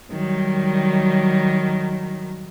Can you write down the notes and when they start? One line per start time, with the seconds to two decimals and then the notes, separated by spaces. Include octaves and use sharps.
0.11 D#3 F#3 G3